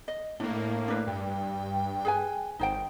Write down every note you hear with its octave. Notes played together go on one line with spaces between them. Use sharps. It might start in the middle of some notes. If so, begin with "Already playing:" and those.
D#5
A2 A#3 D4
D4 B4
G2 G5
G#4 B4 G#5
G#1 D#4 C5 G5